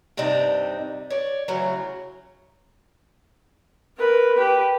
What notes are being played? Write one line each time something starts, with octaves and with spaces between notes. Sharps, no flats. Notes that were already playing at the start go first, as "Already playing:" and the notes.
G2 C3 C4 D4 D#4
C#5 D5
A2 C#3 E3 F#3
A#4 B4
G4 B4